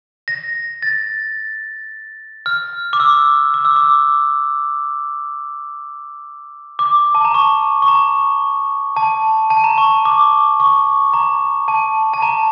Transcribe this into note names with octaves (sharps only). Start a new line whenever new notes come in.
A#6
A6
F6
D6
E6
D6
E6
D6
D6
A5
A#5
C#6
C#6
A#5
A5
A5
A#5
C#6
D6
C#6
A#5
A5
A5
A#5